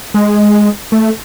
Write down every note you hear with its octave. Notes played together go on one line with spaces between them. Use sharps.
G#3
A3